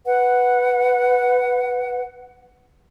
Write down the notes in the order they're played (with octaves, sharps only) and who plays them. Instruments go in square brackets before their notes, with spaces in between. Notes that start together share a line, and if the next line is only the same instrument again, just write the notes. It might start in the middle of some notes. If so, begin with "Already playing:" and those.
[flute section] B4 F#5